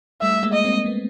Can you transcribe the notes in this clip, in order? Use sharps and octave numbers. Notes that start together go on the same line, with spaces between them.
G3 A3 E5
G#3 A#3
D#5
A#3 C4
A3 B3